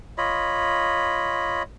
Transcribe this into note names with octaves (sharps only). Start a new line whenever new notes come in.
F4 C#5 D#5 B5